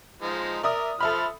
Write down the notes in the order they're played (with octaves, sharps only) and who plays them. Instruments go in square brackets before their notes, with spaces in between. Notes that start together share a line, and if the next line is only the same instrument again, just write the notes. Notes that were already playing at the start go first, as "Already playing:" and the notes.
[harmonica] F3 G#3 D#4
[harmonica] A#4 [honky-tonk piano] D5 E5 D#6
[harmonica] F3 F6 [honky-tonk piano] A4 E5 B5